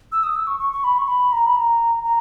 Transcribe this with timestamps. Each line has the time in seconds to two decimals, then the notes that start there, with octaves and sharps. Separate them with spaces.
0.12 E6
0.24 D#6
0.36 E6
0.47 C#6
0.60 C#6
0.73 C#6
0.84 B5
0.98 C#6
1.08 B5
1.32 A#5
1.46 B5
1.56 A#5
2.04 A#5